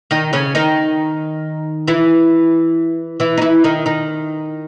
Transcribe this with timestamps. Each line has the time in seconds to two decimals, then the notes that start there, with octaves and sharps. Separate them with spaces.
0.11 D#3 D#4
0.33 C#3 C#4
0.55 D#3 D#4
1.87 E3 E4
3.20 E3 E4
3.37 D#4
3.41 E3 E4
3.64 D#3 D#4
3.86 D#3 D#4